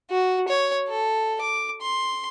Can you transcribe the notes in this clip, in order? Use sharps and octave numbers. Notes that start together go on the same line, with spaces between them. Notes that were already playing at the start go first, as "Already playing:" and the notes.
F#4
C#5
A4
D6
C6